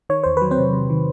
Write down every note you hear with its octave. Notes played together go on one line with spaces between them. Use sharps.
D#3 C#5
E2 C5
F#3 B4
C4 C5
C3
C3
D#3